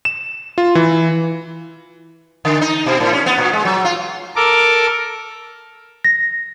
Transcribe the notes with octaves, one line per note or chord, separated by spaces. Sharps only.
E7
F4
E3
D3
D#4
B2
A2
C#4
B3
A#2
G#3
F#3
F4
A4 A#4 D6
A#6